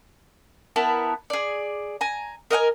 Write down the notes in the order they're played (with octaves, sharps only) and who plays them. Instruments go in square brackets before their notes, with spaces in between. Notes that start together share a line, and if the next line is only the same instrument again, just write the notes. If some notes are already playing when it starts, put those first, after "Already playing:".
[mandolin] B3 E4 A#4 A5
G#4 D5
G#5 A#5
A#4 D#5 F#5 G#5